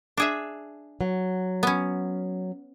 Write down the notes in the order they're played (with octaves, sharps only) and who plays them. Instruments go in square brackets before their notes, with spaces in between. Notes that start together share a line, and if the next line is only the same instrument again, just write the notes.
[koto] D4 G#4 E5
[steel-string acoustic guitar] F#3
[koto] B3 C#4